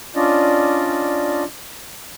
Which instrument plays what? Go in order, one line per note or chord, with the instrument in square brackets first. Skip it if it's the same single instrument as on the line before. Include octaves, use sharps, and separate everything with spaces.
[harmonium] C#4 D4 F4 D5 D#5